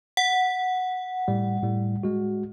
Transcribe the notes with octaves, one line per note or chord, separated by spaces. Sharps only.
F#5
A2 G3
A2 G3
G#3 F#4